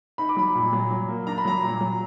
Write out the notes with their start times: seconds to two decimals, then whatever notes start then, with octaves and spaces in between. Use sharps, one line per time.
0.18 D#4 B5
0.29 D6
0.37 F#3 B5
0.55 A#2
0.73 F#3
0.91 F#3
1.09 A#3
1.27 D4 A#5
1.38 B5
1.45 F#3 A#5
1.63 A#2
1.81 F#3